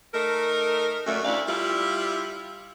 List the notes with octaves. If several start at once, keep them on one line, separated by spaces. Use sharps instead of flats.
A3 D#4 A#4
F#2 A#2 A3
D2 E4 D5 F5
G3 E4 F4